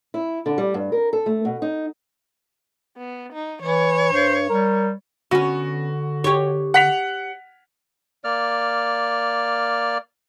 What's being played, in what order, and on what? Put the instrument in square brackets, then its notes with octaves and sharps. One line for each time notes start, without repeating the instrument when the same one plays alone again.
[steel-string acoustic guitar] E4
D3
G3
G2
A#4
A4
A3
B2
D#4
[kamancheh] B3
D#4
[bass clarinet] E3 [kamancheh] C#5
[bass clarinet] G2 [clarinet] C5
[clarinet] G3 [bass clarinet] A#4
[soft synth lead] D3 [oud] B3 C#4 [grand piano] F#4
[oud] G4 C#5
[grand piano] F#5 B6 F7
[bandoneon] A#3 D5 F6